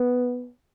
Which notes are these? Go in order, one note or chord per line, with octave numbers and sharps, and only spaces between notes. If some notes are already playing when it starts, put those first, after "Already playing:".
Already playing: B3